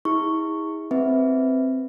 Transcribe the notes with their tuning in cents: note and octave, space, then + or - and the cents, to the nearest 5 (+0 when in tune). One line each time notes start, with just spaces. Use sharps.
E4 -40 G#4 -30 C#6 +0
C4 +0 B4 +0 E5 -10